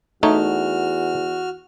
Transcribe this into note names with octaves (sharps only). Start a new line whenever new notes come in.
E2 A3 D#4 F#4 C#5 F6